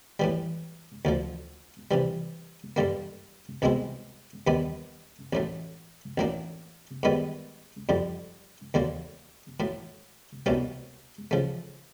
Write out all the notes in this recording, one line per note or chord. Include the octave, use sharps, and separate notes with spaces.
A2 E3 G3
D2 D3 F3
C3 E3 G3
G2 D3 G3 A#3
C2 B2 G#3 C4 E4
D#2 D#3 G3 B3 D4
A1 A2 F#3 A3
A1 A2 F#3 A#3 D4
G#2 D#3 G3 B3
F2 D3 G3
D#2 D3 F#3 A#3
A2 F#3 A3
C2 B2 G3 A#3 C#4
C#3 F3 A3